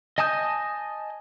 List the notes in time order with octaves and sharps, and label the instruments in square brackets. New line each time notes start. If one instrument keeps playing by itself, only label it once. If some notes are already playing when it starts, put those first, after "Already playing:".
[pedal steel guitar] D#5 G#5 A5 D#6 G6